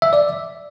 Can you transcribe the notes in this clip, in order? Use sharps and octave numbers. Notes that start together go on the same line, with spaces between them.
E5
D5